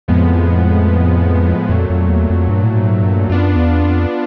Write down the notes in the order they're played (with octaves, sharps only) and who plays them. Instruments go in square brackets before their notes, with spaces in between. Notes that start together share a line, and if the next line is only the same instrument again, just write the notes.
[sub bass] F2 [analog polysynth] A2 F3 G#3 B3
[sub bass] F2 [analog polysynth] A#2 F#3 A3
[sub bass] F2
E2
F2
G2
A2
G#2
G2
[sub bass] F#2 [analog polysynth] B3 D4 F4
[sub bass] E2
F2